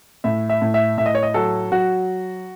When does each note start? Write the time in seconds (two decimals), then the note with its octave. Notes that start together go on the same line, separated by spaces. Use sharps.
0.24 A2 E5
0.49 E5
0.62 A2
0.74 E5
0.97 A2 E5
1.06 D#5
1.15 C#5
1.23 D#5
1.34 F#3 A4
1.72 F#3 F#4